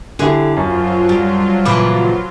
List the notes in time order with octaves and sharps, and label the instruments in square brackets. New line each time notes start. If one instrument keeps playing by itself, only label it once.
[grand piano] D3 E4 G4 [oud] G#4
[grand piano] F#2 [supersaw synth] F3 F#3 F4
[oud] G3
[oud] A#2 C#3 E3 [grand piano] B5 D6